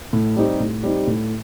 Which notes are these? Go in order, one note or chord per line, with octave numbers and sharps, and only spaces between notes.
A2
G3 C4 D#4 G4
A2
G3 C4 D#4 G4
A2